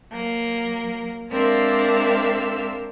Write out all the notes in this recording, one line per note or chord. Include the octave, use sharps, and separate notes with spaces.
F#3 A#3
G#3 C4 D4 A#4 E5 F5